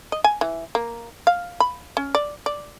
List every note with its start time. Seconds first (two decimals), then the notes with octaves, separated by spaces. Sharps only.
0.12 D#5
0.24 G#5
0.41 E3
0.75 A#3
1.27 F5
1.60 B5
1.97 C#4
2.15 D5
2.46 D5